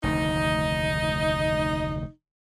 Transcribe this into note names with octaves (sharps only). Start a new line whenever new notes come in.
F1 D2 D#3 D#4